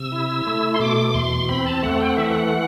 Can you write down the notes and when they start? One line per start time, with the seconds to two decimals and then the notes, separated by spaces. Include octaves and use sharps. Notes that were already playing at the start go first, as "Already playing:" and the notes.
Already playing: C3 E6
0.12 E4
0.47 A3
0.74 C6
0.80 B2 D6
1.08 D6
1.14 E2 C6
1.49 C4 B5
1.66 A5
1.83 A3 F#5
2.00 G5
2.09 F#5
2.17 E3 E5
2.26 F#5